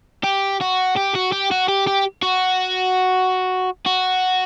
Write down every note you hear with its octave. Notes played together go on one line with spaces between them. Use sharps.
G4
F#4
G4
F#4
G4
F#4
G4
G4
F#4
F#4